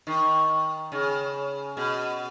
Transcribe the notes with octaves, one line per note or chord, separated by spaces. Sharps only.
D#3
C#3
B2